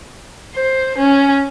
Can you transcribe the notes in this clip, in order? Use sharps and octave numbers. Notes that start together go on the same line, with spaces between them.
C5
C#4